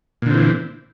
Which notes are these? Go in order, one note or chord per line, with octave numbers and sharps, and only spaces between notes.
A#2 D3 E3 C4